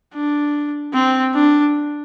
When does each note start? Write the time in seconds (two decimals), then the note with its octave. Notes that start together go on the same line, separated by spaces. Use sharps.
0.14 D4
0.94 C4
1.34 D4